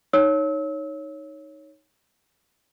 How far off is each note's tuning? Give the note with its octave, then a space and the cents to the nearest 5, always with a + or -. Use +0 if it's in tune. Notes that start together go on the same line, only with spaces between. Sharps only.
D#4 +0 C#5 +0 E6 -35